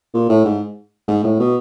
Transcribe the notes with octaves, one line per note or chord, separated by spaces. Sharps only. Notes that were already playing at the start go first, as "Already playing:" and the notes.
A#2
A2
G#2
G#2
A2
B2